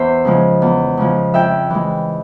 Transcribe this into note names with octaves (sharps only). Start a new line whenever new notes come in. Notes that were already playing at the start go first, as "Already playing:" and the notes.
Already playing: E2 C5 E5
C#3 F3 G#3
E2
C#3 F3 G#3
F2 E5 G5
E3 G#3